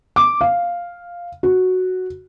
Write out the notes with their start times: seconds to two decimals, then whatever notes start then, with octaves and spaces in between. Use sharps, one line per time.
0.16 D6
0.41 F5
1.43 F#4